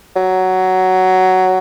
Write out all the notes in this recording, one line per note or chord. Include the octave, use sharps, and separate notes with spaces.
F#3